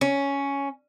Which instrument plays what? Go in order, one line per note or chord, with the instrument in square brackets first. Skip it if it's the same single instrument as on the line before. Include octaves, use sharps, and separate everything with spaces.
[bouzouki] C#4